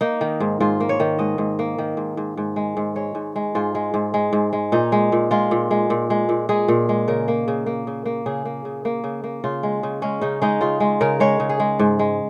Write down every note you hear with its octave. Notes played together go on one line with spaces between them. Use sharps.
A#3 D#4
D#3
G#2
G#2 F4
A#3
C#5
D#3
G#2 D#5
G#2
A#3
D#3
G#2
G#2
G#2
G#3
G#2
G#3 C#5
G#2
G#3
G#2 F4
G#3
G#2
G#3
G#2
G#3
A#2 D#4
G#3
A#2
G#3 F4
A#2
G#3
A#2
G#3
A#2
G#3 G#4
A#2
G#3
C#3 A#4
A#3
C#3
A#3
C#3
A#3
C#3 G#4
A#3
C#3
A#3
C#3
A#3
C#3 F4
G#3
C#3
G#3 C#4
C#3 D#4
G#3 D#4
C#3 F4
G#3
C#3 A#4
G#3 C#5
C#3
G#4
G#3
G#2
G#3